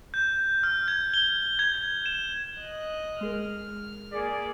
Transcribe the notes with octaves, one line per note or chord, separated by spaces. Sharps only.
G6
F6
G#6
G7
G#6
E7
D#5 F#6
G#3 G#4 A#4 F6
A#3 G#4 D5 B6 C#7